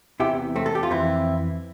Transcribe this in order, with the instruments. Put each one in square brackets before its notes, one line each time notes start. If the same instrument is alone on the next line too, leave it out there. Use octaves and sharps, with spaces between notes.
[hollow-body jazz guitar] E2 C3 E3 E4 G4
A3 C4
A4
G4
F4
F2 E3 C4 E4